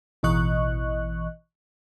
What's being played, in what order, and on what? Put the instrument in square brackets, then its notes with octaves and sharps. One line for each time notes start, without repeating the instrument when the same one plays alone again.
[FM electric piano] A1 B2 E3 D#5 C#6 F#6